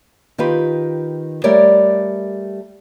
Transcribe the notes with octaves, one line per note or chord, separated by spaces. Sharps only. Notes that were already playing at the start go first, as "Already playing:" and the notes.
D#3 F4 G4 B4
G3 A3 G4 A#4 C#5 D5